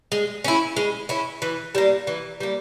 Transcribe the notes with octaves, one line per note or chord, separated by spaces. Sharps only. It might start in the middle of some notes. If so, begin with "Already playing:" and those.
G#3
C#4 E4
G#3
C#4 E4
E3
G3 A#3
E3
G3 A#3